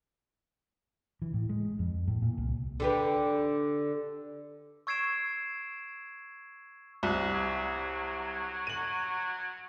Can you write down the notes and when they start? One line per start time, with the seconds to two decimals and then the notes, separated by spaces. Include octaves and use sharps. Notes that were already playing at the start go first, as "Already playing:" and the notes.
1.22 E3
1.34 A2
1.49 G#3
1.79 F2
2.08 A2
2.22 A#2
2.38 C2
2.80 D3 G4 B4
4.87 C#6 E6 G#6 C7 D7 E7
7.03 C2 F#4
7.34 F#3
8.67 D#7 F#7